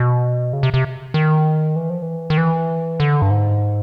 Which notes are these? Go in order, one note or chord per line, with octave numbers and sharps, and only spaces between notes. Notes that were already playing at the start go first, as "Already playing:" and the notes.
Already playing: B2
C#3
C3
C3
D#3
E3
F3
E3
D#3
E3
D3
G2
G#2